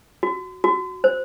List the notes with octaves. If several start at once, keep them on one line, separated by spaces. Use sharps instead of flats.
F#4
F#4
C5